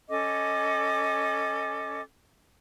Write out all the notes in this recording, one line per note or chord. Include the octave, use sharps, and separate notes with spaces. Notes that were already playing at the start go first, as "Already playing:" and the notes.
C#4 A4 D#5 D6